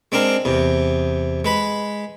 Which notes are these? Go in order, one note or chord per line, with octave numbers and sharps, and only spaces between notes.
G#3 C4 D4 A#4
E2 C3
G#3 B4 B5